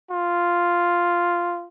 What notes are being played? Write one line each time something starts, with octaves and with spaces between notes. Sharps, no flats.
F4